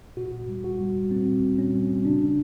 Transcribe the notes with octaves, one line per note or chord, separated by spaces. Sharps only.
A#2 F#4
G3
F#4
G3
A#2 C4
A#2
C#4
G3
C#3 D4